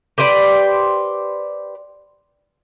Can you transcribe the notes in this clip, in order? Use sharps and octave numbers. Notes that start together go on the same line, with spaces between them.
G4 B4 C5 D5